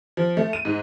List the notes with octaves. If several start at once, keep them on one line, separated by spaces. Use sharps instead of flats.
F3
A3
D#7
G#2